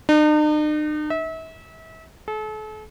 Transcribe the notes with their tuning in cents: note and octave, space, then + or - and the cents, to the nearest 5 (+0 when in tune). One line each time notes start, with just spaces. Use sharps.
D#4 -45
E5 -35
A4 -40